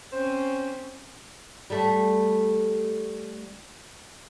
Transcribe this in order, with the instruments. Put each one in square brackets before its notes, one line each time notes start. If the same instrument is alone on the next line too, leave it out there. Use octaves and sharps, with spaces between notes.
[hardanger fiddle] C4 C#4 [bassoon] C5
[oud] G3 A3